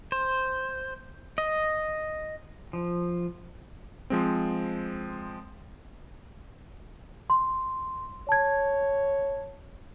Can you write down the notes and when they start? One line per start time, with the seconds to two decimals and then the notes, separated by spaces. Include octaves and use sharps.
0.12 C5
1.38 D#5
2.73 F3
4.10 F3 G#3 C4
7.30 C6
8.29 C#5 A5 G#6